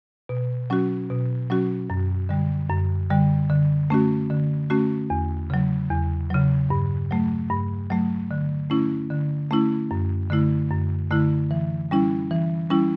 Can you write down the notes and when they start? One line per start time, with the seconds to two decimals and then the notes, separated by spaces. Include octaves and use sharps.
0.29 B2
0.70 F#3 C#4 F#4
1.10 B2
1.50 F#3 C#4 F#4
1.90 F#2
2.29 D3 G3
2.69 F#2
3.10 D3 G3
3.50 D3
3.90 A3 C#4 F#4
4.30 D3
4.70 A3 C#4 F#4
5.10 E2
5.50 C#3 F#3
5.91 E2
6.30 C#3 F#3
6.70 G2
7.11 F#3 A3
7.50 G2
7.90 F#3 A3
8.31 D3
8.70 A3 C#4 E4
9.11 D3
9.51 A3 C#4 E4
9.91 F#2
10.30 D3 A3 E4
10.71 F#2
11.11 D3 A3 E4
11.51 E3
11.91 G3 C#4 E4
12.31 E3
12.70 G3 C#4 E4